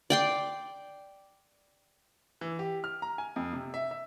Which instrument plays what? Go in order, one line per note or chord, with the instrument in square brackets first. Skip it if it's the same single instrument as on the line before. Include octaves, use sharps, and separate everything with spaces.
[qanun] D5 G5 C6
[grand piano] E3
G4
F6
A#5
G#5
F2
C3
E5
E5